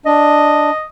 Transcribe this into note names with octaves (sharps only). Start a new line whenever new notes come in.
D4 D#5